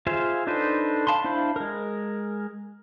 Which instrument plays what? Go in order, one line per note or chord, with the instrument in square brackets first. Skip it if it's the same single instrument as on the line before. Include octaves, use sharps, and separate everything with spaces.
[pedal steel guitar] F4 G#4 C5 E5 F5
D4 D#4 A4 B4 C5
F5 A5 B5 C6
D4 E4 C5 F5 B5
G#3 A#4